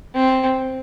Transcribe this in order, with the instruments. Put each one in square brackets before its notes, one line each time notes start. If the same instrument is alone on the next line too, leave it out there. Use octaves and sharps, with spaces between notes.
[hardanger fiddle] C4